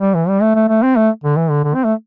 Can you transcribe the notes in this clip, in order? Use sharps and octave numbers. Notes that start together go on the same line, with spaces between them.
G3
E3
G3
A3
A3
A3
C4
A3
D3
E3
D3
D3
C4
A3